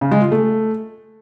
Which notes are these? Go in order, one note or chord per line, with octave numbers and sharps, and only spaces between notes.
C#3
G#3
F4
A3